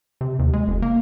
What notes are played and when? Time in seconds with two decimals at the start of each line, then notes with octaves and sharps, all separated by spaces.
0.21 C3
0.39 D#2
0.53 G#3
0.68 F1
0.82 A#3